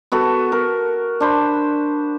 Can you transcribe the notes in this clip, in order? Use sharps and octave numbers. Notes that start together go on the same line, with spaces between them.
B3 F#4 A4
A#4
D4 C5 B5